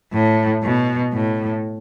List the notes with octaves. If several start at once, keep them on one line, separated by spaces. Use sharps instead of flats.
A2
B2
A2